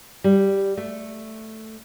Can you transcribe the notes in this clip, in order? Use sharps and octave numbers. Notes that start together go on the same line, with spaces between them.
G3
A3